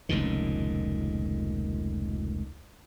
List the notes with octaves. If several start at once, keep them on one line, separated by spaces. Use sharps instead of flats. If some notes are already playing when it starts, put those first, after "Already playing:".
F1 C#2 A#2 D#3